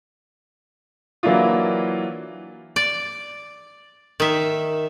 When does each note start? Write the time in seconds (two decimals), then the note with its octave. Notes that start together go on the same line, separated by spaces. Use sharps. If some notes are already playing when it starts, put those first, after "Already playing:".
1.23 E3 F#3 A#3 D4 E4 F4
2.76 D5
4.20 D#3 E5